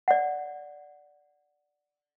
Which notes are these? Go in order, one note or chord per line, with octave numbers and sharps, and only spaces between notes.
D5 F#5